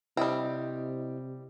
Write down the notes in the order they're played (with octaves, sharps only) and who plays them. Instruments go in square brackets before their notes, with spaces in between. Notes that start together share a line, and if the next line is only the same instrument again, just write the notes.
[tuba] C3 [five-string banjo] G3 C4 [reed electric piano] E4 D#5